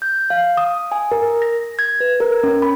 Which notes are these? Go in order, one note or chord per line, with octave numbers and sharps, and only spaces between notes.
G6
F5
D#6
G#5
A#4
A#6
G#6
B4
A#4
C#4
B5